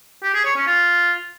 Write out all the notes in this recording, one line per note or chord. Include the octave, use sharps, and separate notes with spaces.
G4
G#4
C#5
C#4
F4